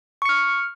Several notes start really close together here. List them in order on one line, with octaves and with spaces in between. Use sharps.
C#6 C#7 F6